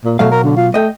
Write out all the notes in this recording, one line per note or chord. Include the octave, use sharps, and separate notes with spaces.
A#2
B2 F#3 A3 F5
A#4
D3
F4
A3 D#5 G5